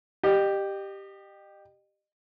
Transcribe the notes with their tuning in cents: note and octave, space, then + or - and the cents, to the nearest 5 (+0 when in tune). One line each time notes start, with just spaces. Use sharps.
G4 +0 D#5 -35